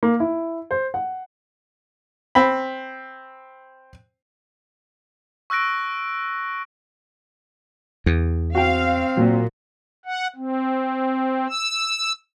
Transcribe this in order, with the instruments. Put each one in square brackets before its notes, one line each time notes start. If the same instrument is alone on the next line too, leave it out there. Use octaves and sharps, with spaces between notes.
[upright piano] A#3
E4
C5
F#5
[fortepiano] C4 B5
[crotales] C#6 E6 F#6 A#6 D7
[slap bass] E2
[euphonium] C4 [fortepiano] F#4 G5 [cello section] F5
[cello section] A#2 [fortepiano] F#3
[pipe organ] F#5
C4
E6